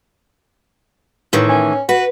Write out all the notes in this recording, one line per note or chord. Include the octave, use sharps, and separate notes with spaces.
A2 D#3 E3
C#4
F#4 B4